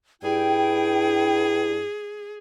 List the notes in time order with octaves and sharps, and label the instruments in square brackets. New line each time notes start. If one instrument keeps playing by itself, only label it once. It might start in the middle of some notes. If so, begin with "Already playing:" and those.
[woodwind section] G2 E4 [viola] G#4 [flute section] G5